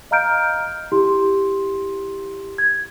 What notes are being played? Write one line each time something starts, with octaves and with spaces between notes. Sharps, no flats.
D#5 F5 A#5 F6 G6 D7
E4 G4 C6
G#6